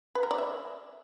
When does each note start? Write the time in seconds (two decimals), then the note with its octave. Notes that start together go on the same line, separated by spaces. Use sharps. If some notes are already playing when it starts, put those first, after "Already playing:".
0.15 B4
0.23 A#4
0.31 D5
0.38 E5